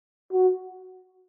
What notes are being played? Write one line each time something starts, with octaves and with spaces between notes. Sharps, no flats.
F#4